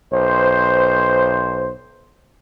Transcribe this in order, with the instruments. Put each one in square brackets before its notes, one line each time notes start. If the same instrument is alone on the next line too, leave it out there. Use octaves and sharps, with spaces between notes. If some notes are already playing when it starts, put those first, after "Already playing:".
[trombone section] B1 C5